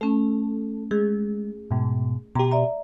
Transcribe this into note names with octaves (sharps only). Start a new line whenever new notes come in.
A3 C#4 A4
G#3 G#4
G#2 B2
B2 G4 A#5
D5 E5 A#5